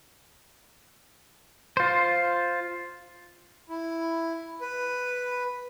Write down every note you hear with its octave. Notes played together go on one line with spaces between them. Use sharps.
F4 C5
E4
B4